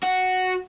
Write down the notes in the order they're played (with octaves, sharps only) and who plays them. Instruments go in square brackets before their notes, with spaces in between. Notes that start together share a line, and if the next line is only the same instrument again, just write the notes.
[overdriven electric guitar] F#4